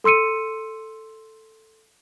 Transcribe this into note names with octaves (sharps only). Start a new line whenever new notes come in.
A4 C6 E6 C#7 D#7